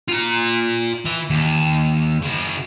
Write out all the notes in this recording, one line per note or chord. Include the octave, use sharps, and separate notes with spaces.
F4 A#5
E3 E5
D#2
C#3 F#4